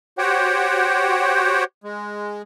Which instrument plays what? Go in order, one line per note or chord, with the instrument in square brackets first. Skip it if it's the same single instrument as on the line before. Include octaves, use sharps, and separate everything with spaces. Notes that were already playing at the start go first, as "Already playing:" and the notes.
[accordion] F#4 G4 C5 C#5 F#5 G5
G#3